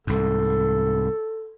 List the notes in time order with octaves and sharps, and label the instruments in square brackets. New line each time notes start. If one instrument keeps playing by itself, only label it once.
[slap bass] C2 G#2 [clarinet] A4